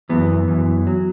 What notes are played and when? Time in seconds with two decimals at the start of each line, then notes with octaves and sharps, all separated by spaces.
0.09 F#2 E3 B3
0.48 F#2 E3
0.87 F#3